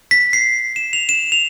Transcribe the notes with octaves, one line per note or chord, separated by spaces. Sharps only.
B6
C7
E7
F7
E7
F7